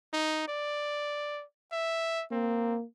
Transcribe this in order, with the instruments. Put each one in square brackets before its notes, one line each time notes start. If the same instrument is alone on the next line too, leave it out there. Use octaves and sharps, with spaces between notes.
[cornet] D#4
D5
E5
[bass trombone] A#3 [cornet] C4